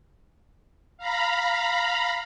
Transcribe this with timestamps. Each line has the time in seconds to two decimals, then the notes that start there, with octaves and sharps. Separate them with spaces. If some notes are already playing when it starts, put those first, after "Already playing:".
0.98 F5 A#5 B5